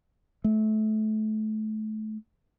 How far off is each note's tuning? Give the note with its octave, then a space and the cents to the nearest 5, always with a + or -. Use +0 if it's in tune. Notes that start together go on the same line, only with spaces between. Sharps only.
A3 -25